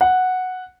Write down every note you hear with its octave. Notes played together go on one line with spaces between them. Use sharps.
F#5